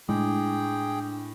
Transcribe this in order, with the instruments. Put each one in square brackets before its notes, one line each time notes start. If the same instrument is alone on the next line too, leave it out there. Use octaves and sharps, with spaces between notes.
[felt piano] A2 [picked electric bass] G#3 [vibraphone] D4 [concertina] G#4 G5